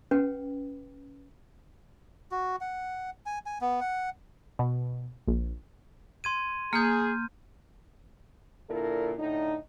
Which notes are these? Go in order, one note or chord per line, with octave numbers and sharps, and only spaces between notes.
C#4 B4 F#5 G5
F#4
F#5
G#5
G#5
B3
F#5
B2
A#1
C6 G#6 D#7
A#3 G#4 F6 G6
A#2 D3 E4 A4 A#4
A2 D3 D#4